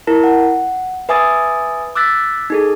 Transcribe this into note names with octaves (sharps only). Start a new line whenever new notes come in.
E4 A#4 A5
F#5
B4 E5 G#5 D6 D#6 A6
D6 E6 F#6 A6 B6
D#4 G#4 A4